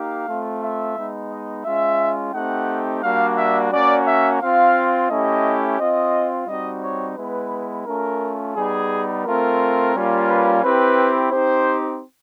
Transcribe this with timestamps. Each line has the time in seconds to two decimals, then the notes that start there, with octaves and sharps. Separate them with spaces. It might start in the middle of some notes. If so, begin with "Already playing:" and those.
Already playing: A#3 D#4 G4 F5
0.27 A3 C4 F4
0.61 E5
0.96 G#3 B3 D#4
1.31 D#5
1.65 G#3 C#4 F4 E5
2.33 A3 C4 D#4 G4 F#5
3.03 G3 A#3 D4 F#4 F5
3.37 E5
3.72 A#3 C#4 F#4 D5
4.06 E5
4.41 C4 F4 F5
5.10 A3 C#4 E4 G4 D#5
5.79 C4 F4 D#5
6.48 G3 C4 D#4 F#4 D#5
6.83 C#5
7.17 G#3 B3 E4 B4
7.86 A3 C#4 F4 A#4
8.55 G3 B3 D#4 G#4
9.25 A3 C4 F4 A#4
9.94 G3 A#3 C#4 F4
10.28 B4
10.63 C4 E4 G4 B4
11.32 C4 D#4 G4 C5